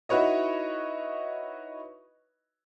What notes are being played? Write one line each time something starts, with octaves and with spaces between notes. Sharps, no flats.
D#4 E4 F#4 B4 C#5 D#5